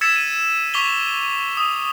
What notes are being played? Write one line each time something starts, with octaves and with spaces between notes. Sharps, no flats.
E6 G#6 A6 B6 C#7 E7
D#7
C#6 D6 B6 F7 G7
D#6